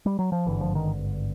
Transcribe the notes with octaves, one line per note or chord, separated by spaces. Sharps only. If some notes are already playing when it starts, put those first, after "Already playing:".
G3
F#3
F3
G#1 G2 D3 E3
F3
D#3